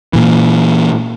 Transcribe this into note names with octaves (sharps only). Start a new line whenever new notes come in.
A#2 E3